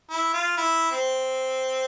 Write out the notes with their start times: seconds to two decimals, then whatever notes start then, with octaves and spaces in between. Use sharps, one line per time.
0.11 E4
0.34 F4
0.58 E4
0.92 C4